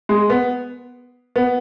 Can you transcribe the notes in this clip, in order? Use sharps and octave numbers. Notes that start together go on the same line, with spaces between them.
G#3
B3
B3